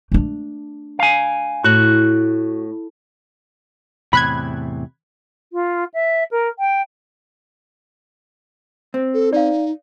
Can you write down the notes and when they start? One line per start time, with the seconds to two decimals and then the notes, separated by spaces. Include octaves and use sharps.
0.12 A3 D4
0.99 F5 G#5
1.64 A2 F#4
4.13 E2 A2 C3 B5 F#6 G#6
5.53 F4
5.94 E5
6.31 A#4
6.59 G5
8.94 C4
9.14 A4
9.33 D#4 D5 F5